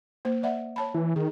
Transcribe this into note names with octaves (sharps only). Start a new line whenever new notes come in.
A#3 C5
D5 E5 F#5
C#5 A5 B5
E3
D#3 G#4